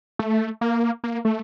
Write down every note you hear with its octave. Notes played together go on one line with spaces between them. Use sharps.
A3
A#3
A#3
A3